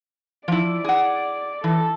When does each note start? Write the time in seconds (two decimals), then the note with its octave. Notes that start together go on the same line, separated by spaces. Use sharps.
0.48 F3 E4 D5
0.84 G#4 F#5
1.64 E3 A4